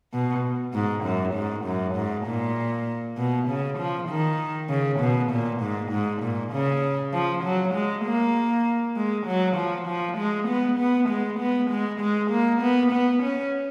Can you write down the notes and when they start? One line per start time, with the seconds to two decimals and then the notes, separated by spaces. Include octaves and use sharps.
0.13 B2
0.74 G#2
1.04 F#2
1.35 G#2
1.65 F#2
1.96 G#2
2.26 A#2
3.18 B2
3.48 C#3
3.78 F3
4.09 D#3
4.70 C#3
5.00 B2
5.31 A#2
5.61 G#2
5.91 G#2
6.22 A#2
6.53 C#3
7.13 F3
7.44 F#3
7.74 G#3
8.05 A#3
8.96 G#3
9.27 F#3
9.57 F3
9.88 F3
10.18 G#3
10.48 B3
10.79 B3
11.09 G#3
11.40 B3
11.71 G#3
12.01 G#3
12.31 A#3
12.62 B3
12.92 B3
13.23 C#4